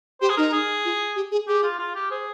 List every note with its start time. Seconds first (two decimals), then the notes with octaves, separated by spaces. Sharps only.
0.21 G4 C5
0.30 G#4
0.37 D#4 A#4
0.52 G#4
0.85 F4
1.16 G4
1.32 G#4
1.48 G4 G#4
1.63 F4
1.79 F4
1.95 G4
2.11 G#4 C5